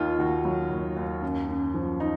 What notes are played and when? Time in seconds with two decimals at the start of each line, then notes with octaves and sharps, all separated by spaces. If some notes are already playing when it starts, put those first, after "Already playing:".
Already playing: D#2 D#3 D#4 F4
0.19 D#2 F#4
0.45 F#3
0.71 D#2
0.97 D#2
1.22 F#2
1.49 F#2
1.74 F3
2.00 D#4